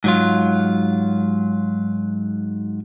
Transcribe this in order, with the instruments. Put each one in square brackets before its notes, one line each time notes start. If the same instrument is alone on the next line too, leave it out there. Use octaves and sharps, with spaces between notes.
[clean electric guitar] G#2 F#3 F4